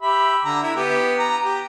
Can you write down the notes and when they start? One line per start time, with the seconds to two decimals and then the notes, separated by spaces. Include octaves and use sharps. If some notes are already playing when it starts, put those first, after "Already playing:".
0.02 G4 E5 B5
0.45 D3 A#5
0.63 E4
0.76 B3 G4
1.19 A#5
1.45 G4